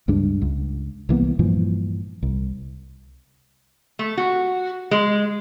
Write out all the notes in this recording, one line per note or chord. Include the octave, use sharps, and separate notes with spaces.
C#2 G2 G#3 D4
C#2
C2 E3 A#3 B3
G2 A#2 E3 F3
C2
A3
F#4
G#3